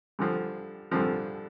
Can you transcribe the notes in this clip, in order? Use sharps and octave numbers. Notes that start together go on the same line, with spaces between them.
G2 D3 F3
G2 D3 F3